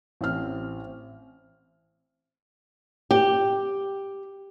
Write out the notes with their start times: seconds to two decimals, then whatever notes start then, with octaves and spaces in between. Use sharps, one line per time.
0.21 A1 C4 F6
3.11 G4